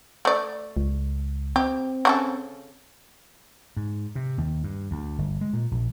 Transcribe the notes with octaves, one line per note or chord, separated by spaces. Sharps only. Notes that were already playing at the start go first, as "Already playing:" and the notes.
A3 D5
C#2
C4 G4
C#3 F#4 A4
G#2
C3
D#2
G2
D2
G1
G#3
A#2
A#1